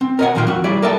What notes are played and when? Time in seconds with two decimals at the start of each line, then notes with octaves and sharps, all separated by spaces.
0.01 C4
0.19 A#4 C5 D#5 E5 F#5 G#5
0.35 D#2 A#2 F3 A#4 F5 G5
0.47 F2 F#4
0.64 G3 E4 G#4 D5
0.82 A4 A#4 D5 E5 G5 A5